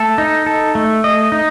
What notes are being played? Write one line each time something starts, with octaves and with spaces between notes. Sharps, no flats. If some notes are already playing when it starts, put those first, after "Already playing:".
Already playing: A3 A4
D#4
A4
A3
D#5
D#4